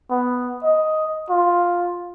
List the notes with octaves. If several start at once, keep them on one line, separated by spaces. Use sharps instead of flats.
B3
D#5
F4